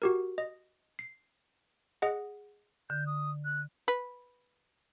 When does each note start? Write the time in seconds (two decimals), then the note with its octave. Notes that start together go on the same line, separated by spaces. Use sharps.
0.02 F#4 G4 A#4
0.38 D#5
0.99 C7
2.02 G#4 D#5 F#5
2.90 D3 G6
3.07 D#6
3.45 F#6
3.88 B4